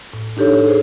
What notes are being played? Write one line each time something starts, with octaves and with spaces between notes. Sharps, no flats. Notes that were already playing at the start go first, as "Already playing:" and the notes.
A2
D4 D#4 G4 A4 C#5
G#4 C5